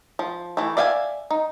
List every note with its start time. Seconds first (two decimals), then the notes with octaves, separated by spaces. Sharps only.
0.19 F3
0.57 E3 A3
0.77 D5 E5 F5 G5 G#5
1.31 D#4